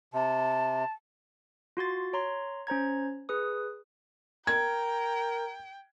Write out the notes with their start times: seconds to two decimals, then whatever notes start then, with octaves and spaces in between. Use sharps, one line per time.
0.14 C3 A5
1.77 F4 F#4 C6 A6
2.13 C#5 A#5 C6
2.67 C#4 C5 A#5 G#6
3.29 G#4 B4 D#6
4.47 A#4 G5 A#5 G#6